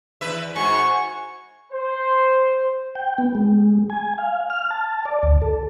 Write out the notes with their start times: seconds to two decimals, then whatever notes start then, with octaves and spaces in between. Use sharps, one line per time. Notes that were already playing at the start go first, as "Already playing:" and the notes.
0.21 E2 B4 E5
0.56 G#2 F#4 G#5 C#6
1.72 C5
2.95 G5
3.18 B3
3.35 G#3
3.90 G#5
4.18 F5
4.50 F6
4.71 A5
5.05 D5
5.23 D2
5.42 A4